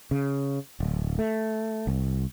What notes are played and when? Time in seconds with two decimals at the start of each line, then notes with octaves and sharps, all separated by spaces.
0.11 C#3
0.80 D1
1.19 A3
1.87 C2